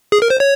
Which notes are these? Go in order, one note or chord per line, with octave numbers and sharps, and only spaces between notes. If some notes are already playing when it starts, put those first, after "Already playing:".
G#4
A#4
C5
C#5